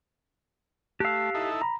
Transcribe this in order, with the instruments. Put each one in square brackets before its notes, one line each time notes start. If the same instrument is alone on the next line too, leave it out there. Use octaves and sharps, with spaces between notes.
[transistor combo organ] A3 [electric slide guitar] G4 F5 [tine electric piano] E6 F#6
[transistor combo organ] D#4 E4 A4
[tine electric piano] A#5 B5